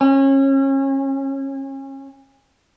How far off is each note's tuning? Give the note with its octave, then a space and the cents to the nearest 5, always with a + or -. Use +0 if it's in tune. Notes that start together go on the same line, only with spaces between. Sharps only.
C#4 -30